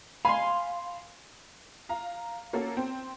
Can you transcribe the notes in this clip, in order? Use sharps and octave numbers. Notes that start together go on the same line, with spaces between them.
F5 G#5 B5 C6
F5 A#5
A#3 C#4 F#4 A4
C4